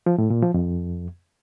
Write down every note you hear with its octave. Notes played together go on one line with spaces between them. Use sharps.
F3
A2
A#2
F3
F2